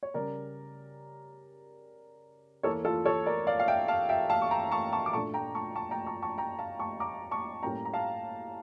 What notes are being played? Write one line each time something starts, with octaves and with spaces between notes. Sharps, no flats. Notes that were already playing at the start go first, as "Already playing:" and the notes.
C#5
C#3 G3 C#4 A#4 D5
E2 E3 A#3 A4 C#5
F4 A4
A4 C#5
A#4 D5
D5 F5
F5
E5 G5
F5 A5
E5 G5
F5 A5
C#6
G5 A#5
A5 C#6
A5 C#6
D6
A#2 A3 D4 A5 C#6
G5 A#5
A5 C#6
A5 C#6
G5 A#5
A5 C#6
A5 C#6
G5 A#5
F5 A5
A5 C#6
A#5 D6
A5 C#6
A2 G3 A#3 C#4 G5 A#5
A#5
F5 A5